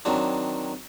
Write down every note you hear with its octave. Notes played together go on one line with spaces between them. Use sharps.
D#3 F#3 C4 D4